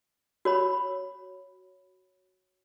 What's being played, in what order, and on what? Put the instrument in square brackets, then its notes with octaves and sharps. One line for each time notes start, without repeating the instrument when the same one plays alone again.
[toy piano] F#4 C#5 B5